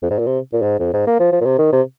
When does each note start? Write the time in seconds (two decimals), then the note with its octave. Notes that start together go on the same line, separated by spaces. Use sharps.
0.02 F2
0.10 G#2
0.18 A#2
0.26 C3
0.53 A#2
0.62 G#2
0.79 F2
0.93 G#2
1.06 A#3
1.19 F3
1.32 F3
1.41 A#2
1.45 C3
1.58 D#3
1.72 C3